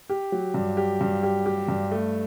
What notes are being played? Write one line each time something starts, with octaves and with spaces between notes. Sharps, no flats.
G4
F#3
G2
G4
G2
G4
G4
G2
A3